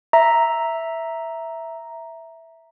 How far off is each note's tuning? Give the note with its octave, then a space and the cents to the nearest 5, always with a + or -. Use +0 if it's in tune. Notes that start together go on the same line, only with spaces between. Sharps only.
E5 +0 A#5 +0